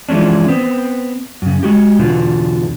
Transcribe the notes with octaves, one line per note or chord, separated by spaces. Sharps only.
E3 F3 G#3 C#4 D4
B3 C4
F#2 C#3
G#3 F#4 G4
E2 B2 D3 F4 F#4